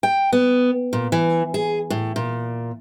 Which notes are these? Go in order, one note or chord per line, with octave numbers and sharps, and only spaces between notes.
G5
B3
A#2
E3
G#4
A2
A#2